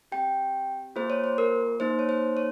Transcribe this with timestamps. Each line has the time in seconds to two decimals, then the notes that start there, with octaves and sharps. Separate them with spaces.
0.12 C4 G4 G5
0.96 A#3 F4 G#4 C5
1.10 C#5
1.24 C5
1.38 A#4
1.80 A#3 D#4 G#4 C5
1.99 C#5
2.09 C5
2.37 C#5